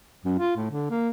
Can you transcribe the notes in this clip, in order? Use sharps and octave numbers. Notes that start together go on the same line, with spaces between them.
F#2
F4
A2
D3
A#3